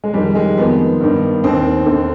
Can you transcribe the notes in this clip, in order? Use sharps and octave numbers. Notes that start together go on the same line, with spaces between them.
G#3
F2 D#3 G3
G#3
F2 D#3 B3
G2 D#3
D#2 D#3 C4
D#2 D3